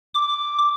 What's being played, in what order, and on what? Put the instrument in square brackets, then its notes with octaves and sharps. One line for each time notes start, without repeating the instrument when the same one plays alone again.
[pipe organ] D6